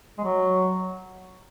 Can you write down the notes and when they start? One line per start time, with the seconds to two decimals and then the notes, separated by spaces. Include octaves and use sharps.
0.18 G#3
0.24 F#3